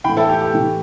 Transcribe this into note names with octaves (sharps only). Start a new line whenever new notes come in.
A2 E3 G5 B5
E4 A4
G4
G4
A2 E3